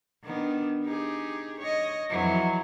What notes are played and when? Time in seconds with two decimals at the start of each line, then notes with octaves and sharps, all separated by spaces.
0.23 D#3 B3 D4
0.83 D#4 G4 G#4
1.60 C#5 D#5
2.09 F2 E3 F#3